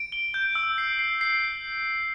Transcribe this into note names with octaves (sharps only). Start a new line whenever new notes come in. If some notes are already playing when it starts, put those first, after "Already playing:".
Already playing: D7
G7
G6
E6
C7
C7
C7